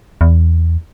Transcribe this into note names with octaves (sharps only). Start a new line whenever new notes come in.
E2